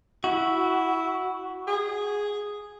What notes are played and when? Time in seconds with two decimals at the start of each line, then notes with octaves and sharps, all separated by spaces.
0.24 E4 F#4
1.67 G#4